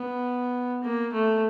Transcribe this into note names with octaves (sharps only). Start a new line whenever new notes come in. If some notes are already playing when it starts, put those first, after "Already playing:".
Already playing: B3
A#3
A3